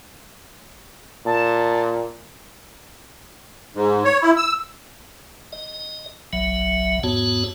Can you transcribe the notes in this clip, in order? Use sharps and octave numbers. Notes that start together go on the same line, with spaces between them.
A#2 A5
G#2
C#5
E4
E6
D#5
F#1 B1 F#3 E5
E2 G#2 B3 F#4 C#5 A5